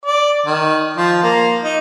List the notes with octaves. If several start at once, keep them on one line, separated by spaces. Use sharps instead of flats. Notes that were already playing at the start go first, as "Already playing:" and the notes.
D5
D#3
F3
A#3
D#4